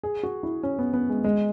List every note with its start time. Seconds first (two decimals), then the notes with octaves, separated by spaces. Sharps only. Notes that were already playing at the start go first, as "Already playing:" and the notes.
0.03 G#4
0.23 F#4
0.43 E4
0.63 C#4
0.79 B3
0.94 B3
1.09 G#3
1.24 G#3